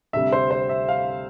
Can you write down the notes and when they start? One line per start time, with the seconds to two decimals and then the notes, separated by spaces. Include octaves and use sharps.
0.13 D2 C3 G3 E5
0.32 C5
0.51 C5
0.69 E5
0.89 F5